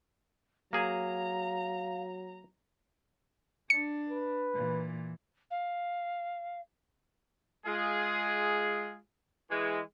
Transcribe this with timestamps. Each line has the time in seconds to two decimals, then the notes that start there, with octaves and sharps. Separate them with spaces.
0.73 F#3 A#3 G#4 F5 G#5 A#5
3.70 D4 C#7
4.09 B4
4.55 A#2 E3
5.51 F5
7.66 G#3 F4 G#4
9.50 E3 G#3